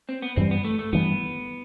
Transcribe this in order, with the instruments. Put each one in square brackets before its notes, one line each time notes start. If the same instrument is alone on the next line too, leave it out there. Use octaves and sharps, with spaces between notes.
[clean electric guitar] C4
B3
[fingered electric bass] G2 E3 G3 [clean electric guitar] C4
[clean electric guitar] B3
A3
A3
[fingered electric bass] G2 E3 G3 [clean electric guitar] B3